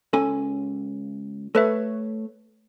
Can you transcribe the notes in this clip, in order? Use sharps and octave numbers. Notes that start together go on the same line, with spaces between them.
C#2 C#4 A4 G#5
A3 A4 B4 C#5 E5